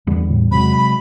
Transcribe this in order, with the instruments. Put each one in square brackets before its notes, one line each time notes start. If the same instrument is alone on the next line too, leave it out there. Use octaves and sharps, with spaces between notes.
[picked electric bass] E2 [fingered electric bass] D3 G3
[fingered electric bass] A2 G3
[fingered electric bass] C3 F#3 G#3 [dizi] B5
[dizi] B5